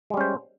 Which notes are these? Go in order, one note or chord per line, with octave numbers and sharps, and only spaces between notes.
G3 G#3 C#4 C5